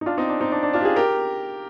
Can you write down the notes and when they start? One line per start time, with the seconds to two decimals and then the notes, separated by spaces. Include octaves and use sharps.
0.01 D#4
0.06 D4 F4
0.17 C4 D#4
0.29 D4
0.40 C4 D#4
0.52 D4
0.63 D4
0.73 D4 F4
0.81 G4
0.85 F4 G#4
0.96 G4 A#4